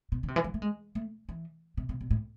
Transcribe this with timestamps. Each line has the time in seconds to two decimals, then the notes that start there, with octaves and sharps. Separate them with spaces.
0.12 B2
0.23 D3
0.28 C3
0.36 E3
0.44 F3
0.54 A3
0.62 G#3
0.95 A3
1.29 E3
1.77 C3
1.89 C3
2.01 B2
2.11 A2